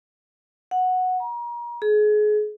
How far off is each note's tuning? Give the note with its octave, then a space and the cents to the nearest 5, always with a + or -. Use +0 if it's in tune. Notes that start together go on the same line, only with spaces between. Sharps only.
F#5 -5
A#5 +35
G#4 +30